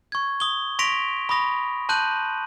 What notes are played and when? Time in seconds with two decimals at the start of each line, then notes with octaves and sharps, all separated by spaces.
0.12 C#6 G#6
0.40 D#6 G7
0.79 C6 C#6 A#6 B6 D7 F7
1.29 B5 C#6 D#6 A#6
1.89 A5 C6 F#6 G6 D#7 F#7